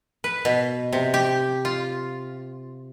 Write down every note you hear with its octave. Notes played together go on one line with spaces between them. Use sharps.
B4
B2
C3
G4
F4